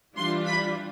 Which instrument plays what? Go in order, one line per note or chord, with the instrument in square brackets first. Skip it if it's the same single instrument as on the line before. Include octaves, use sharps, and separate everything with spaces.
[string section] E3 G3 D4 F4 C6
B5